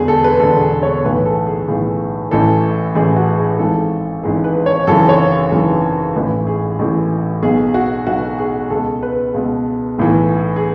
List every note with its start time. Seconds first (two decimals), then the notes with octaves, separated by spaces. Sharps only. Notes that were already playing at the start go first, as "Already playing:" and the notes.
Already playing: E1 E2 D3 G#4
0.08 A4
0.24 B4
0.40 E1 E2 D3 A4
0.61 G#4
0.83 C#5
1.04 B1 A2 E3 B4
1.25 A4
1.47 G#4
1.68 B1 A2 E3 G#4
2.31 A1 A2 E3 A4
2.95 A1 A2 E3 G#4
3.16 F#4
3.38 G#4
3.59 G#1 G#2 E3 A4
4.23 G#1 G#2 E3 G#4
4.44 B4
4.66 C#5
4.87 G#1 F#2 C#3 E3 A4
5.09 C#5
5.51 G#1 F#2 C#3 E3
6.15 A1 A2 E3 B4
6.47 G#4
6.79 A1 A2 E3
7.43 B1 B2 G#4
7.74 F#4
8.07 B1 B2 F#4
8.39 G#4
8.70 C#2 B2 A4
9.03 B4
9.34 C#2 B2
9.98 B1 A2 E3
10.56 G#4